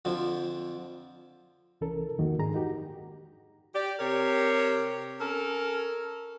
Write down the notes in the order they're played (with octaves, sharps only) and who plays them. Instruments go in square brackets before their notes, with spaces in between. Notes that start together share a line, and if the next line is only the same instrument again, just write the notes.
[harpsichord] F2 D3 F3
[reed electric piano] C2 E3 C#4 A4 A#4
C2 F2 D#3 A#3 F#4
G#2 D#3 D4 G#4 A#5
D#4 F#4 G4
[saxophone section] G4 D5
C3 G4 A#4 C#5
C#4 A4 A#4